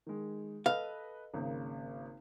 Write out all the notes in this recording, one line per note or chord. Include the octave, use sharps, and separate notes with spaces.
D#3 G#3
A4 B4 D#5 F5
G#1 C#3 A#3